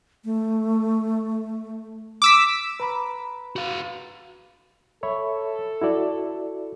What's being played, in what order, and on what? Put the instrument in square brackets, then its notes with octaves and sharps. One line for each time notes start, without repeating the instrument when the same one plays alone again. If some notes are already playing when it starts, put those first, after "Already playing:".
[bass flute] A3
[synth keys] D6 E6 B6
[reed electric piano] B4 A#5 B5
[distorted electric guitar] F#4 F5
[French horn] A4 [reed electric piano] C#5 E5 B5
[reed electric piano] E4 F#4 D5